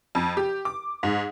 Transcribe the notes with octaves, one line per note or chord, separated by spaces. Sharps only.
F2
G4
D6
G#2